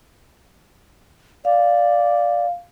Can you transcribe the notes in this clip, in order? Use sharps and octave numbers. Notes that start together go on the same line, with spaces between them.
D5 F5